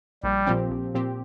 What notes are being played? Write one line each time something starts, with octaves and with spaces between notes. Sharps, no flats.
A#1 G3
A#2 F3 C4 G4
A#1
A#2 F3 C4 G4